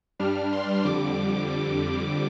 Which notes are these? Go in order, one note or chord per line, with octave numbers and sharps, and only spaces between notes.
G2 G3 D4 F6
C6
F2 D3 G3 D6